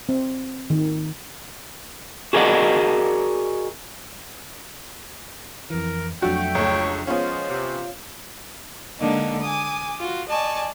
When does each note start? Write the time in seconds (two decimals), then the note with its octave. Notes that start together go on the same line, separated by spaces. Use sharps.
0.09 C4
0.70 D#3
2.33 F#4 G#4 A#4 D5 D#5 F#5
5.70 F2 E3 A#4
6.22 F2 F#3 A3 D4 F#4 G5
6.55 C#2 A3 C#5
7.07 F3 G#3 B3 C#4 F4 C5 C#5 F5
7.49 C3
9.00 D3 G#3 A#3 D4 D#4
9.41 G#5 D6 D#6
9.99 F4 F#4
10.28 D5 D#5 G#5 A5 C#6